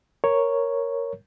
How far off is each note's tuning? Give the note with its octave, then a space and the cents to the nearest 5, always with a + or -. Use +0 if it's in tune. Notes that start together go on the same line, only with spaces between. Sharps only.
A#4 +0 C#5 +0